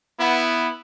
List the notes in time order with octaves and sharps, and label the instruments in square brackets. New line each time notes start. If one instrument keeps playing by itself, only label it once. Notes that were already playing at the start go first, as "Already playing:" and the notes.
[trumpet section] B3 [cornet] E4